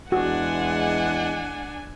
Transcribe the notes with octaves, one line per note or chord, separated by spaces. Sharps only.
E2 G#3 D4 F#4 F#5 G#5